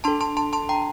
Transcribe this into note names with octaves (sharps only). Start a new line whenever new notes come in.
D4 A4 A5 C6
A5 C6
A5 C6
A5 C6
G5 A#5